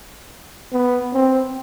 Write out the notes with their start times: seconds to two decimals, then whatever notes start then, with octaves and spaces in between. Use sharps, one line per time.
0.72 B3
1.13 C4